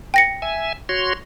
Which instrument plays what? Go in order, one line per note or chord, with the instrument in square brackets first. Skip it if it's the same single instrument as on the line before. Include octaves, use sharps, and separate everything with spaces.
[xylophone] G5 A#6 C#7
[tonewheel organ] E5 G#5
F#4 C#5 C6